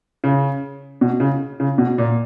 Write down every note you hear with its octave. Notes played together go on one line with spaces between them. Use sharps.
C#3
B2
C#3
C#3
B2
A#2